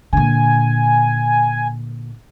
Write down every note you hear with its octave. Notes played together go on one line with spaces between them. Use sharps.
A#2 D3 G#5